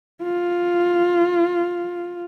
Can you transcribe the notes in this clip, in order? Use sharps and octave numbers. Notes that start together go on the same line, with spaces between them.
F4